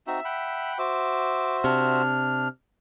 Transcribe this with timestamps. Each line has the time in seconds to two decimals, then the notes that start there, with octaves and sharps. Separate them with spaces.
0.07 C4 D#4 F#4 E5
0.25 F#5 G5 B5
0.79 F#4 C5 E5 D6
1.64 C3 D4 F6